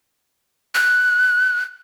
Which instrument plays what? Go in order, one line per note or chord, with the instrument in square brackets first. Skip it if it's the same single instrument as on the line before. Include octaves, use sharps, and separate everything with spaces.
[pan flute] F#6